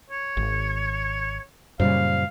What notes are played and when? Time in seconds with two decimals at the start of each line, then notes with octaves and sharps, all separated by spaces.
0.10 C#5
0.37 G#1
1.80 F#2 A#2 C#3 G3 C5 F5